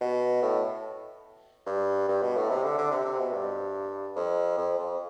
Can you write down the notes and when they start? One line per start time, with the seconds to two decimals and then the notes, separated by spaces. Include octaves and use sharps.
0.01 B2
0.42 A2
1.66 G2
2.08 G2
2.22 B2
2.36 A2
2.50 C3
2.64 D3
2.78 D3
2.91 C3
3.05 C3
3.19 B2
3.33 G2
4.16 F2
4.58 F2
4.78 F2